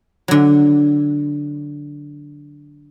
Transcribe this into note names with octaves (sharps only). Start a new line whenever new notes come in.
D3 F#3